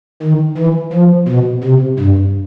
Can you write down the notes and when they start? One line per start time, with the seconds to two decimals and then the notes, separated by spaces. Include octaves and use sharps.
0.23 D#3
0.58 E3
0.93 F3
1.28 B2
1.64 C3
1.99 G2